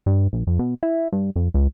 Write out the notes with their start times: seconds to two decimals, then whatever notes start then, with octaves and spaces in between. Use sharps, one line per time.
0.06 G2
0.33 A#1
0.47 F2
0.59 B2
0.83 E4
1.12 G2
1.36 F2
1.54 C#2